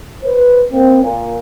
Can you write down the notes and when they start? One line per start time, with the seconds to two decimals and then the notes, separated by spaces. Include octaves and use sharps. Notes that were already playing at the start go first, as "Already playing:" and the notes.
0.24 B4 C5
0.72 A#3 C4
1.02 A#2